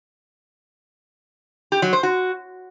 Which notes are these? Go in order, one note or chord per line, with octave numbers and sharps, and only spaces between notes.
G4
F#3
C5
F#4